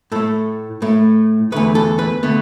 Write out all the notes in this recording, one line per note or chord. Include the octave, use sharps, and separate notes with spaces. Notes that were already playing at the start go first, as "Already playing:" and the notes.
A2 A3 A4
A2 A3
E2 D3 A3 B4
A4
B4
D3 A3 B3